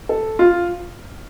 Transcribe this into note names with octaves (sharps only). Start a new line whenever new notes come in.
A4
F4